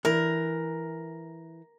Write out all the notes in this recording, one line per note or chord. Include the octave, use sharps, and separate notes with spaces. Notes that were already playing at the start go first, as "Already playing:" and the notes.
E3 A#4